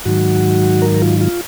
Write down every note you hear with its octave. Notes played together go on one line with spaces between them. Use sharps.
G#2 D#3 F#3 F#4
A#4
F4
F4